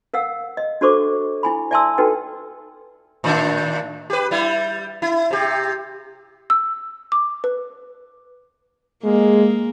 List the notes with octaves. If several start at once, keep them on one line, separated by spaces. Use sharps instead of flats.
A#4 F5 F#5 E6
D#5
D4 F#4 A4 C5 C#6 D6
E4 G#5 B5
D5 E5 G#5 A5 C6 E6
D#4 F#4 A4 B4 G5
A2 D#3 D4
G4 B4
G3 E4
E4
C3 G4
E6
D6
B4
G#3 A#3